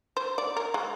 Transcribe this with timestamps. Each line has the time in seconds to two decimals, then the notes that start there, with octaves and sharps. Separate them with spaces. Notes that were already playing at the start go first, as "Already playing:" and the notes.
0.17 C5
0.38 D5
0.57 A#4
0.74 G#3